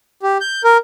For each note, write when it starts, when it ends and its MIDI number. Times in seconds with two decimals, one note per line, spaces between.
0.23 0.38 67
0.41 0.62 91
0.64 0.77 70